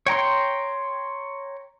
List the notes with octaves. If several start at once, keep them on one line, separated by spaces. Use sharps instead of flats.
C#5 G5 A#5 C6